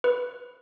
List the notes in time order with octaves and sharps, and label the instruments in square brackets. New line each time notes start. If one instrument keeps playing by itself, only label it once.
[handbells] B4